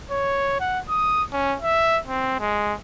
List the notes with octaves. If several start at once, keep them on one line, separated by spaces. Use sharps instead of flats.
C#5
F#5
D#6
C#4
E5
C4
G#3